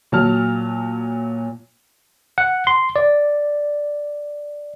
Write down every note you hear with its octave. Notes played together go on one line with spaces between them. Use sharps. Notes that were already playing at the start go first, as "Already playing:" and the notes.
A#2 F#3 A5 F6
F#5
C6
D5